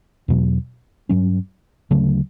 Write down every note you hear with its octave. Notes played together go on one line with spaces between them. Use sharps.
E2 B2 F#3
G2 F#3 C#4
D2 C#3 F#3 A3